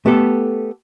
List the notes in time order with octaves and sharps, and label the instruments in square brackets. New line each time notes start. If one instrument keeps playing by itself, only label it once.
[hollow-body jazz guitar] A3 B3 G4 A4